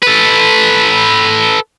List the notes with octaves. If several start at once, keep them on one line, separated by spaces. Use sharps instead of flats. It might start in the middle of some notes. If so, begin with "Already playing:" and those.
A4 B4